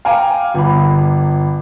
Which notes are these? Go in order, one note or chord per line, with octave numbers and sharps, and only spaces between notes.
F5 G5 G#5 A#5 D6
G1 B5